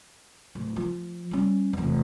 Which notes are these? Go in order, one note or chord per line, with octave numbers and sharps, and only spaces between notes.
D1
F3
G3 C#4
F1 E2